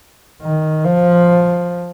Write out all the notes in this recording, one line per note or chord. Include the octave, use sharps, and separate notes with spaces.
D#3
F3